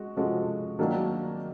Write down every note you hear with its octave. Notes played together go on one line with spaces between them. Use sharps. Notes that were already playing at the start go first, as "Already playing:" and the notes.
Already playing: G#3 F#4
F3 G#3 C#4 F#4 A4
D#3 F#3 A#3 D4